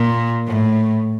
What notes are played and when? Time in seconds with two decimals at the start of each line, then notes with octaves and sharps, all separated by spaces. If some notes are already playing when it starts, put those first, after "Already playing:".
Already playing: A#2
0.47 A2